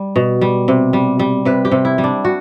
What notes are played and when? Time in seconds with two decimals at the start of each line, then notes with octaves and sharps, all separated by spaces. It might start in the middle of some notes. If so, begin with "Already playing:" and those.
Already playing: G3
0.16 B2
0.41 G3
0.68 C3
0.93 G3
1.19 G3
1.45 C3 B4
1.65 G4
1.72 C3
1.85 E4
1.98 G3
2.04 D4
2.25 F#4